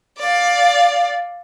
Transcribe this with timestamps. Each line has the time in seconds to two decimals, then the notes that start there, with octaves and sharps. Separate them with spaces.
0.18 D5 F5